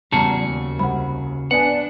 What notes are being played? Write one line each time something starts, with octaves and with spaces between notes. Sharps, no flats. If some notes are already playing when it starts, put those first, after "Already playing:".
E2 C#3 G3 F#4 G#4 A5 A#5
D#2
C2 F#5 B5
B3 D4 B4 D5 F#5 G#5